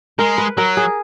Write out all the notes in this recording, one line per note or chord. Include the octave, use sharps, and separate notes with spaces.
G#3 A#4
B4
F#3 A#4
G#4